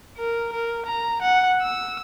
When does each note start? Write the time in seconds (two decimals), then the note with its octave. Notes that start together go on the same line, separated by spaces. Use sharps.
0.18 A#4
0.53 A#4
0.86 A#5
1.22 F#5
1.62 E6